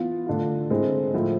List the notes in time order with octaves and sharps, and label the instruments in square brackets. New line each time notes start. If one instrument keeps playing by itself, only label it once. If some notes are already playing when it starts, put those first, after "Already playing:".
Already playing: [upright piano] E3 B3 F4
D3 A3 D4 F4
D3 G#3 C4 E4
A2 F3 A3 E4